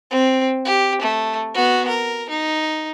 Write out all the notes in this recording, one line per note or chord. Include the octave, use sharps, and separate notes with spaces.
C4
G4
A3
B3 F#4
A#4
D#4